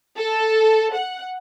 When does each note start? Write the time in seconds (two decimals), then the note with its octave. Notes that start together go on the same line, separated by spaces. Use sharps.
0.17 A4
0.95 F#5